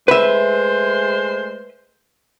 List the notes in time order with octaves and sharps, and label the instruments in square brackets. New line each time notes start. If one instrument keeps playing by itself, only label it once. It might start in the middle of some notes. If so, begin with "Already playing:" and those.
[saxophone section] G#3 A3 C5 [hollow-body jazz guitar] B4 E5